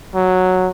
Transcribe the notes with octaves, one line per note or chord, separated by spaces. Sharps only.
F#3